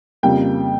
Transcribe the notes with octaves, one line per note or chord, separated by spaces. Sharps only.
F2 C#3 G3 A#3 G5